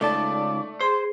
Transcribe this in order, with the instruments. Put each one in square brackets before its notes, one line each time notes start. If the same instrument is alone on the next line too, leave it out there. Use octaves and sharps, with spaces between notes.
[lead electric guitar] C#2 A5 [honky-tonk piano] A3 D5 [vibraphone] D#4 [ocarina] D6
[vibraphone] G#4 [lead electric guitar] C5 [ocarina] C6